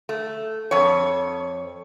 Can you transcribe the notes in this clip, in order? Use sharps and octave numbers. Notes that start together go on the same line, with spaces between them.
A3
F2 C#5